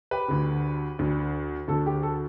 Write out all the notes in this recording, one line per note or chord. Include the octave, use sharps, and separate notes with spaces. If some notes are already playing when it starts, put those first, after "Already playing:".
G4 B4
D2 D3
D2 D3
D2 D3 A4
G4
A4